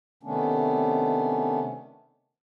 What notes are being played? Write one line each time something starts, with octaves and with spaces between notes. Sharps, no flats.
C3 D#3 A3 B3 C#4 D4